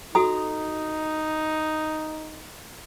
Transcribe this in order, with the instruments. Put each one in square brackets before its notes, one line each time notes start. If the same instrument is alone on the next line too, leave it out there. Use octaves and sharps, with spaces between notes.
[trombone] D#4 [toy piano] F#4 A4 D#6 [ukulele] A#5